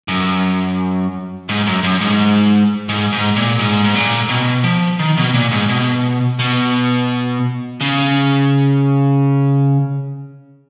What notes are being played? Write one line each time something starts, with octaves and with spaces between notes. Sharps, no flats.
F#2
G#2
F#2
F#2
G#2
G#2
G#2
A#2
G#2
G#2
A#2
B2
F3
D#3
B2
A#2
G#2
B2
B2
C#3